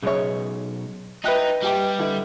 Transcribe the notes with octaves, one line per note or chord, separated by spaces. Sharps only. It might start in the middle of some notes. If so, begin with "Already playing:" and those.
B1 C#3 G#3 C#5
D#4 B4 D#5 E5 G5 F#6
G3 G4 G5 D6
D3 E4